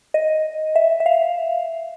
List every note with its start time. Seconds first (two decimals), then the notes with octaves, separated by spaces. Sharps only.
0.14 D#5
0.76 E5
1.00 E5
1.06 F5